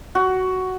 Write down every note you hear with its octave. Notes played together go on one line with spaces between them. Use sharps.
F#4